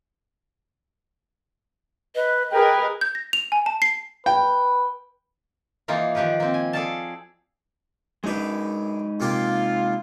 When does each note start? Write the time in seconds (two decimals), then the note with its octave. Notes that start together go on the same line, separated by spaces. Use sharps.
2.15 B4 D#5
2.51 G#4 A#4 B4 G5
3.01 G6
3.15 A#6
3.33 F7
3.52 G#5
3.66 A5
3.82 C7
4.26 B4 G5
5.88 E3 A#3 D#4 F4 F5
6.15 D#3 F3 G4 A#4 B4
6.40 A#3 C4
6.54 G#5
6.73 G#4 A4 D5 F5 G#5 A5
8.24 F#2 G#3 D4 D#4 B4
9.20 C3 A#3 F4 G4